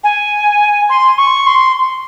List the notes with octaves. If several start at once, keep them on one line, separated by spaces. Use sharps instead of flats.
G#5
C6
C#6
C6